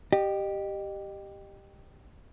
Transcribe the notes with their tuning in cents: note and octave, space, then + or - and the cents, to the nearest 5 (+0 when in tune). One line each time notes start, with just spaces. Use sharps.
G4 +0 D#5 -30